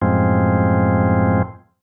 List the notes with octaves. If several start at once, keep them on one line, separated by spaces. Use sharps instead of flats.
F#2 A2 F3 G#3 C4